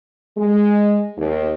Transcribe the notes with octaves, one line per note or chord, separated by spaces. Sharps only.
G#3
D#2